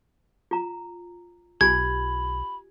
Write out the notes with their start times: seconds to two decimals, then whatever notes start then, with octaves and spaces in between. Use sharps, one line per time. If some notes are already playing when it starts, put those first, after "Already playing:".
0.51 F4 A#5
1.61 B1 F4 G4 G#5 B5 G#6